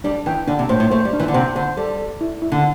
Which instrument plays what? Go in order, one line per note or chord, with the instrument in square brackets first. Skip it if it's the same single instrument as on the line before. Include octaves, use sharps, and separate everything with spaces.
[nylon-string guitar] G3 [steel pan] D4
[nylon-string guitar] E3 [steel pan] G5
[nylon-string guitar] D3 [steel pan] D4
[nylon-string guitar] C3
[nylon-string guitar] A2 [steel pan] C5
[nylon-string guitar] A2
[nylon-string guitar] A3 [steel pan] C5
[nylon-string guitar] G3
[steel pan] D4
[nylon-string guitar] E3
D3
[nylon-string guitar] C3 [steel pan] C5
[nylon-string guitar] D3 [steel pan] C5
[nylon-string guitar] G3 [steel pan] A4
[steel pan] A4
E4
E4
[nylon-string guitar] D3